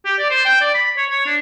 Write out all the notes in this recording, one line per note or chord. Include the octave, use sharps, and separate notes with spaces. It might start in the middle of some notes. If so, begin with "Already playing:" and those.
G4
D5
C5
G5
D5
B5
C#5
C#5
D4